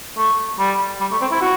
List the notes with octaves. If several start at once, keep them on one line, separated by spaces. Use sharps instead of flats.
A3
G3
G3
A3
C4
E4
F#4